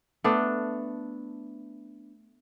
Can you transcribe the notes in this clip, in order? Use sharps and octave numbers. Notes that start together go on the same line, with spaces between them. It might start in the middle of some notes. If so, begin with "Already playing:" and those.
A3 B3 D4